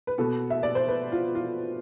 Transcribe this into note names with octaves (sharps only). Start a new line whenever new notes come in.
B4
B2 B3 A4
E5
D5
C5
B4
F4
F4